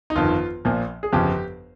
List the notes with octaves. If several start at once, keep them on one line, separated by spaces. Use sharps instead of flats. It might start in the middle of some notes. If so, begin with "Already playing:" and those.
D#4
G1 F2 D#3 F4
A#1 A#2 F3
G#4
G1 F2 C#3 F3 G4